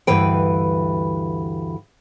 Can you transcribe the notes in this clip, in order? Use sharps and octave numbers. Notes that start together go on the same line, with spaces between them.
D2 G2 E3 B4 G5